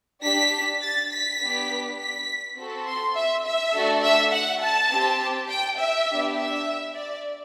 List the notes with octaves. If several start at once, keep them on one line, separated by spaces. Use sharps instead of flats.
D4 G4 B6
A6
B6
B3 D4 G4
B6
C4 F#4 A4
C6
E5
E5
A3 D4 F#4 A4
E5
F#5
A5
C4 G4
G5
E5
B3 D4 G4
E5
D5